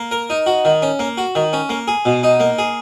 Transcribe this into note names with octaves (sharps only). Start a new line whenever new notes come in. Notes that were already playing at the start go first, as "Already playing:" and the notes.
Already playing: A#3
A#4
D#4
F#4
D#3
C#4
A#3
F#4
D#3
C#4
A#3
G#4
B2
D#4
A#3
G#4